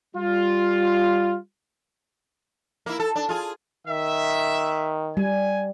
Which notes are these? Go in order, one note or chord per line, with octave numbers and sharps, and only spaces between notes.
G3 F4
A#3 E4
A4
D4
F4 G#4
D#3 E5
G3 G#5